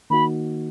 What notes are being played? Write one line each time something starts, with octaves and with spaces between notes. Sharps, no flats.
D#3 A#3 D#4 F#4 B5